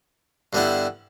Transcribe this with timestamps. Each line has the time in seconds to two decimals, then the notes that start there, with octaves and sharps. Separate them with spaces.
0.53 G2 D3 G3 B3 E4